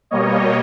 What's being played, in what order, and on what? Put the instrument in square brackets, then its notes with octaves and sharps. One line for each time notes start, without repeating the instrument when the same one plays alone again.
[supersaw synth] B2 G3 A#3 C#5 D#5